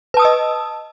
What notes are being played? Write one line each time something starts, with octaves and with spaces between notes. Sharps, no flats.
B4 D#5 A5 D#6 E6